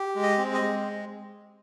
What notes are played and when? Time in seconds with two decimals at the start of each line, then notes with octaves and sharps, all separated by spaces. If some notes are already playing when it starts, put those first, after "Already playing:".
Already playing: G4
0.15 G#3
0.22 D#5
0.38 C4
0.54 D#5
0.61 G#3